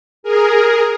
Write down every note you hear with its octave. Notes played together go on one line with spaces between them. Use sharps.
G#4 A#4